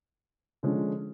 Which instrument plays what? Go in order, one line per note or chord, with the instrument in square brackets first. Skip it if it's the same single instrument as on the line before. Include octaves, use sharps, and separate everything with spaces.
[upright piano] D3 F3 G#3 C#4